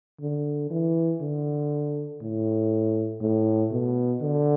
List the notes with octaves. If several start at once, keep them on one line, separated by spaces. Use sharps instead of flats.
D3
E3
D3
A2
A2
B2
D3